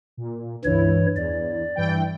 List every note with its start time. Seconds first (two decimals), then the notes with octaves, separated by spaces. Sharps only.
0.17 A#2
0.65 C#2 G2 E3 E4 C#5
1.16 E2 D5
1.76 G2 E3 G5